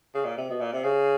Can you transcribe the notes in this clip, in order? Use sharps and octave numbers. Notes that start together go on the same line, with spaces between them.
C#3
A#2
C3
B2
A#2
C3
C#3